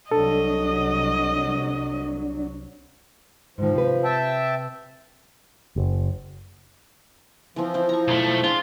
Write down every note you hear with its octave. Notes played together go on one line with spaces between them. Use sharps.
C2 F#3 D4 A4 D#5
G#2 D#3 F3
C3 B4
E5 G5 A5
F#1
E3 F3 C4
C4 E4
A#5 C#6
B1 A3
D4 F4 G#4 D5